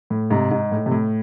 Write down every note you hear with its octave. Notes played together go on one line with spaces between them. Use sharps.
A2
G#2 C3
G#2
A2
C3
A2